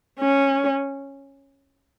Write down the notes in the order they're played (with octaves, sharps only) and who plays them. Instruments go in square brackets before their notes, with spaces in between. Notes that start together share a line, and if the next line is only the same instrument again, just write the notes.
[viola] C#4